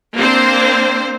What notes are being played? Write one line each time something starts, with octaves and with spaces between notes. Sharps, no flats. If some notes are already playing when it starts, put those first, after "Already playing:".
A#3 C4 D4 C5